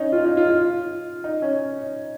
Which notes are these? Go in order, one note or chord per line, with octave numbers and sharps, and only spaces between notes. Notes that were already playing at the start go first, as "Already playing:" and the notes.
Already playing: C#4 D#4
F4
D#4
F4
F4
D#4
C#4